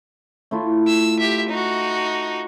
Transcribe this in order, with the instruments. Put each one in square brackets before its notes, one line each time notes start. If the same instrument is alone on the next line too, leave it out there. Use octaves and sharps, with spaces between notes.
[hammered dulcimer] A3 E4 F4
[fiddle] E6
G4 E5
D#4 F#4